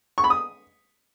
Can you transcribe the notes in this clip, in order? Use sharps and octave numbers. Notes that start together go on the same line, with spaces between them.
C#6
B5
D#6